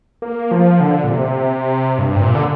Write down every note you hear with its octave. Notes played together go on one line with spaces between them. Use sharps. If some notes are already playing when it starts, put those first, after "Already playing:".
A#3
F3
D3
A#2
C3
G2
C3
A#2
D3